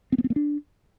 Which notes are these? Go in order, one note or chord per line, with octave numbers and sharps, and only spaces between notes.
C4
B3
C4
A#3
D4